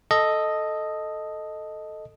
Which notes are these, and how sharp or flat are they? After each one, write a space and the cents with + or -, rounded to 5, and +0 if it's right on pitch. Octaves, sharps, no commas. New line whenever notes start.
A4 +0 D#5 +0